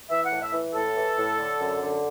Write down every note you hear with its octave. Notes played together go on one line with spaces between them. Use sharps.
E3 E5
F#5
A2
E5
E3
A2 A4
E3
A2
D3
F#2
D3